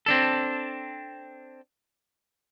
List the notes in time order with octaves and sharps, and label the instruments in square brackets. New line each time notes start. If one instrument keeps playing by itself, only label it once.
[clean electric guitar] C4 D4 A4